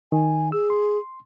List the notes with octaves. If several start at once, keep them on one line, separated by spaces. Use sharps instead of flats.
D#3 G#5
G#4 E6
C6